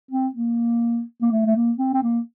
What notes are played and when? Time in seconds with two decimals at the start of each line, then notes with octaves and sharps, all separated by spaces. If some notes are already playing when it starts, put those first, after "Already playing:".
0.11 C4
0.35 A#3
1.22 A#3
1.31 A3
1.46 A3
1.56 A#3
1.79 C4
1.94 C4
2.03 A#3